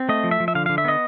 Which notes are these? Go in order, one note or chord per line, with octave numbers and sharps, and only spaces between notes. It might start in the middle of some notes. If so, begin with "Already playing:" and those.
Already playing: C4
A3 D#5
F3
E5
F3
E5
D3 F5
D3 F5
E5
B3 D#5